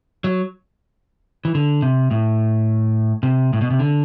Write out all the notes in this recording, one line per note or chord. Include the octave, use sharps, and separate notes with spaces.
F#3
E3
D3
C3
A2
C3
A2
B2
C3
D3